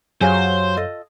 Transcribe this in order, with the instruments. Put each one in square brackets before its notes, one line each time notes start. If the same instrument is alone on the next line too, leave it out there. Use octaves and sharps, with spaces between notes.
[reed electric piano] F#2 C#5 F5 [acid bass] F#3 [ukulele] G4 G#4 G#5 [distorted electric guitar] C5
[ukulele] F4 A4 D#5